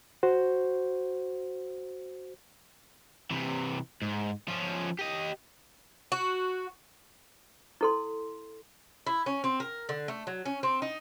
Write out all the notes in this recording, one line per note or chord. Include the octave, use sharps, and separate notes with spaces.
F#4 C5
C3 E3
G#2
F3 C#4
G4 D#5
F#4
E4 A4 C6
E4
C#4
C4
A#4
D3
A3
F#3
C#4
C4
D#4